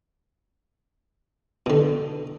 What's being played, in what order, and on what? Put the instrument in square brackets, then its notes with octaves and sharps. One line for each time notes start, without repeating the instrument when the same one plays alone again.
[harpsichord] B2 D3